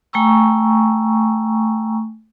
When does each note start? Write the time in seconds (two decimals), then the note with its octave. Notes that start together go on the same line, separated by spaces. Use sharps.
0.13 A3 G5 G#5 A#5 C#6 E6